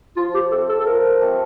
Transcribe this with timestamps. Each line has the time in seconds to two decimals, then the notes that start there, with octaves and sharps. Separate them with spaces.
0.17 F3 F4
0.34 G4
0.51 A3 C4 G4 A4
0.69 A4
0.80 A4
0.86 F3 A#4
1.21 A3 C4 G4